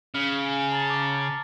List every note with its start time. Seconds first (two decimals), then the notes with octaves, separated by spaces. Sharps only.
0.14 C#3 F6
0.72 A5 A#5 A6
0.90 D6